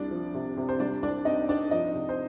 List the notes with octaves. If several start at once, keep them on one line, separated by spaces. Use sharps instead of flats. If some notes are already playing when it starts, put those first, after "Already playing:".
Already playing: C2 D4 D5
F3
C3
C3
C5
G3 D4 D5
C2 D4 D5
C4 D#4 D#5
C4 D4 D5
F3 D#4 D#5
C3
C5